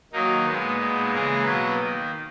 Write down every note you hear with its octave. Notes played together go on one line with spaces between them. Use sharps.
D#3 F#3 A#3 D#4
A#2 G#3 B3
A#2 G#3 B3
C#3 E3 G#3 A#3 A#4
B2 F#3 A#3 B3 B4
D#3 A#3